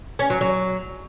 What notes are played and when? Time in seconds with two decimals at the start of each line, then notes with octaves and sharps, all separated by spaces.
0.19 C#4
0.30 F#3
0.41 F#3